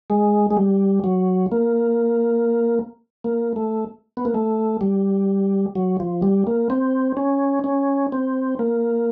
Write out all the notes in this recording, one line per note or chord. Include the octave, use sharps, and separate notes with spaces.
G#3
G#3
G3
F#3
A#3
A#3
A3
B3
A#3
A3
G3
F#3
F3
G3
A#3
C4
C#4
C#4
C4
A#3